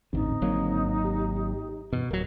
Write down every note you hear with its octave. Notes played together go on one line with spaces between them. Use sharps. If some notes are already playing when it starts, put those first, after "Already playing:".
A1 E2 G#2 D3 C4 D#4
G#1 F#3 A#3
G4
G2 B2 E3
D1 F#3 A#4